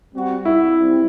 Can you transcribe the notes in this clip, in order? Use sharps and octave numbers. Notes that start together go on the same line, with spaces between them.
G3 C4 F#4
E4
G3 C4